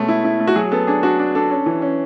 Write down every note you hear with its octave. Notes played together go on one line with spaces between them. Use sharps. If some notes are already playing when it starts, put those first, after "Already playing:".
Already playing: B2 G#3 A3 C#4
E4
E4
A3
F#4
F#3 G#4
B3 A4
D4 G#4
D4 F#4
D4
D4 A4
C#4
E3
C#4